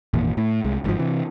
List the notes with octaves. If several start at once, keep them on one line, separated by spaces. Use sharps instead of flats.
G#1 E2 A#2
A2
C2 G#3
G1 G#2 C3 F3
C3 E3